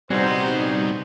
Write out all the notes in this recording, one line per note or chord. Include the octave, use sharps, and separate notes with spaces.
C2 G3 B3 C4 D#4 F#4 G#4 C5